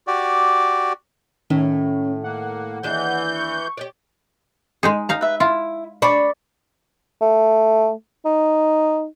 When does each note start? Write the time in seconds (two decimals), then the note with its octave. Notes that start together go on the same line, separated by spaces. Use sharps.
0.07 F#4 G4 D5
1.50 A2 D#3 C#4
2.24 A#3 F#5
2.83 D#2 E3 D4 G#4 G6
3.35 C#6
3.77 G4 C#5 D5
4.83 G#3 D#4 G#4
5.09 D#4 F5 A#5
5.21 B4 E5
5.40 E4 F4
6.02 D4 B5 C#6
7.21 A3
8.25 D#4